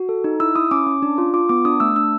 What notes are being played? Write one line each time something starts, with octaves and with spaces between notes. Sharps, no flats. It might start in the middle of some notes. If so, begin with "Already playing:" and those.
Already playing: F#4
A4
D#4
E4 E6
E4 D#6
C#4 D6
C#4
D4
F4
F4 D6
B3 D6
D4 D#6
A3 E6
D4 E6